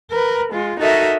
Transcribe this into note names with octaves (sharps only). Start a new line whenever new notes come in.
A#4 B4
G#3 F4
D#4 F#4 A4 A#4 D#5 E5